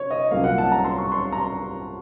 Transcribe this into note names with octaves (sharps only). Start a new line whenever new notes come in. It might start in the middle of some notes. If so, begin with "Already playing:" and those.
Already playing: C#5
D#5
C2 A#2 F#3 A#3 C#4 F5
F#5
A5
A#5
C6
C#6
C6
A#5